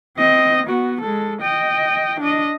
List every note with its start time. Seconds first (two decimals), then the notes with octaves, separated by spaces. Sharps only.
0.17 C4 D#5
0.66 B3 F#4
1.01 G#3 A4
1.42 D#5 G5
2.21 D4 D#5